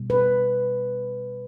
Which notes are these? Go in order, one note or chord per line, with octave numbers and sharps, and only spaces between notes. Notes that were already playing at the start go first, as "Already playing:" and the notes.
Already playing: B2 G3
B4